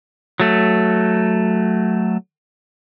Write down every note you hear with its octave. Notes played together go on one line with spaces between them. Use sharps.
F#3 A3